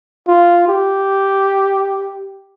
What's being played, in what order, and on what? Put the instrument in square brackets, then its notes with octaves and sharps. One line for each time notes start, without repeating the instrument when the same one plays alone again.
[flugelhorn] F4
G4